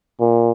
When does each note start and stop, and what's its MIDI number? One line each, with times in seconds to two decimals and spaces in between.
0.20 0.52 46